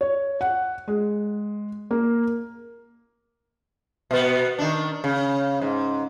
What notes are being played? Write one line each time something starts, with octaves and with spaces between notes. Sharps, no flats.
C#5
F#5
G#3
A#3
B2 B3
D#3 D4
C#3
G#2